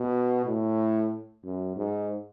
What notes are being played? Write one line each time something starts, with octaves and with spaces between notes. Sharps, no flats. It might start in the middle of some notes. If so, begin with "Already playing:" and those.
Already playing: B2
A2
F#2
G#2